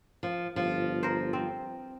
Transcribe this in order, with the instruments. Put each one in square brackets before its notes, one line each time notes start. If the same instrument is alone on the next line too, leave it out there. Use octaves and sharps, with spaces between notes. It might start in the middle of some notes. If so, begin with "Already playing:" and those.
[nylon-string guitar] F3
[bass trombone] G1 [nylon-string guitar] F3
[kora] A#4 C5
C4